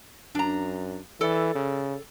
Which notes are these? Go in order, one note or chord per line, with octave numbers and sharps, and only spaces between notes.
F#2 D4 A#5
E3 A4 D5
C#3